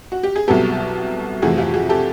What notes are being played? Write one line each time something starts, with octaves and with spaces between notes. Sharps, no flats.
F#4
G4
G#4
C2 B2 F#3 B3 G4 A4
F2 C3 E3 A3 F#4 G#4
F4 G4
F#4 G#4
G4 A4